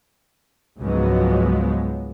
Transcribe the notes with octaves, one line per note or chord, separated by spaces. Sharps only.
C#2 G#2 F3 F#3 G#3 B3